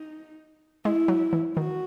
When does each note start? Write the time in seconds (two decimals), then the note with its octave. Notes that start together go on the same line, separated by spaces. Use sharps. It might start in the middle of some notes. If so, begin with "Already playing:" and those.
Already playing: D#4
0.85 G#3 E4
1.08 F#3
1.33 E3
1.56 D#3 F#4